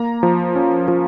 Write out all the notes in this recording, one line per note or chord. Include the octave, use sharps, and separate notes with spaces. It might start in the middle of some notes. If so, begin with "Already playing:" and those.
Already playing: A#3 A#5
F3
C#4
F3